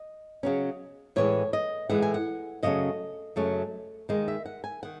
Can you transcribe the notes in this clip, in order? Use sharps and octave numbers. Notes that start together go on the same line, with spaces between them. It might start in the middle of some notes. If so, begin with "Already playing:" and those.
Already playing: D#5
C#3 F#3 C#4
A2 E3 G#3 C#5
D#5
A2 E3 G#3 F#5
G#5
F#5
F#2 C#3 F#3 A3 C#4 D#5
F#2 C#3 F#3 A3 C#4
D#2 D#3 G#3 D#5
E5
F#5
G#5
D#3 F#5